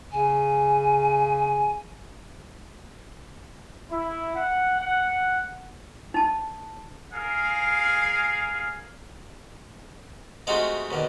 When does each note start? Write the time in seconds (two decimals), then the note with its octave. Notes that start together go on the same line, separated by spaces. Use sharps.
0.12 C#3 G#5
3.91 E4
4.35 F#5
4.79 F#5
6.14 D#4 A5
7.13 G#4 A#4 F5
10.47 C3 G#3 A3 D#4 F4 F#4
10.91 D#2 B2 D3